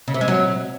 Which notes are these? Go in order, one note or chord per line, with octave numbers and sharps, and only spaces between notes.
C#3
C3
G#3
F#3